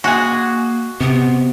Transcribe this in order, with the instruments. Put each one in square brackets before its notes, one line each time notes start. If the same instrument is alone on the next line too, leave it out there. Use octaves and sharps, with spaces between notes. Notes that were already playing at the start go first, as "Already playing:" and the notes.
[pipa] G#3 G#4 [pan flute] A#3 [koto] F#4
[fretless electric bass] C3 [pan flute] B3